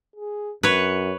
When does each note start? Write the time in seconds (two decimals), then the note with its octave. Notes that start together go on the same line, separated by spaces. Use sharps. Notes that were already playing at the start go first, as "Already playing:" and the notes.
0.16 G#4
0.63 F#2 B4 C#5